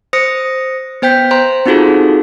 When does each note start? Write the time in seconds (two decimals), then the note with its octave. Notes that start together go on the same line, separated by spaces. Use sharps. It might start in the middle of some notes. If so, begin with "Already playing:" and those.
0.13 C5 D#6 A#6 C#7
1.02 B3 C5 G5 G6 B6
1.31 C5 A#5 C6
1.66 C4 D#4 F4 F#4 G#4 A4